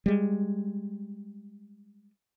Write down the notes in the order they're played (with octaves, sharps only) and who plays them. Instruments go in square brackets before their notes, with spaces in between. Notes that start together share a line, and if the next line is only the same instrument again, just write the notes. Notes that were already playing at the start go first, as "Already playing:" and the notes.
[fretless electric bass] G3 G#3